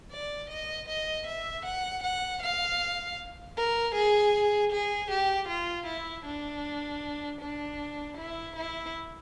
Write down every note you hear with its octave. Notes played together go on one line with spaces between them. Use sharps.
D5
D#5
D#5
E5
F#5
F#5
F5
A#4
G#4
G#4
G4
F4
E4
D4
D4
E4
E4